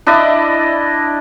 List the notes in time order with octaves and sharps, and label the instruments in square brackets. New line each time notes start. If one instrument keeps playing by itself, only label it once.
[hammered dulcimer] D4 E4 D5 D#5